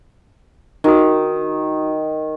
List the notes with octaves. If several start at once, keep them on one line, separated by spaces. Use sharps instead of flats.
D#3 D#4 F#4 D#6